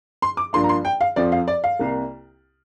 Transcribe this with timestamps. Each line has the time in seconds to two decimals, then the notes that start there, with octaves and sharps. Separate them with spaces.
0.22 C6
0.37 D6
0.53 G2 F3 A#3 D4 C6
0.64 A#5
0.69 C6
0.85 G5
1.01 F5
1.16 F2 F3 C4 D5
1.32 F5
1.48 D5
1.64 F5
1.79 C2 C3 A#3